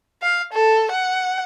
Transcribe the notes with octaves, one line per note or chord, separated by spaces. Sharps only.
F5
A4
F#5